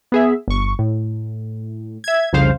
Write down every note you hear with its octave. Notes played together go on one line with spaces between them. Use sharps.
B3 G#4 E5
G1 C#6
A2
E5 G#6
C2 F2 C#3 C5 F5